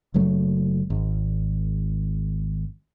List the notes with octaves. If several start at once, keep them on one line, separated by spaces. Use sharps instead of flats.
F#1 C#3 F#3 A3
G#1